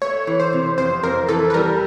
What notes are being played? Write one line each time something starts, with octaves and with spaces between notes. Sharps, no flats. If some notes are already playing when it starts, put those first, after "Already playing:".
A3 C#5
E3
C5
C3
F2 C5
F2 A#4
E3 A4
B4
G3 A#4